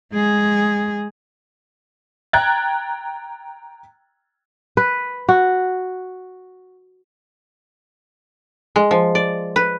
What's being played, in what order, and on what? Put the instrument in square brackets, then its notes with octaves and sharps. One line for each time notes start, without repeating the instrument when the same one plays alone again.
[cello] G#3 G#4
[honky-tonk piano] G5 A#5 F#6 G#6 A6
[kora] B4
F#4
[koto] G#3
F3
D5
B4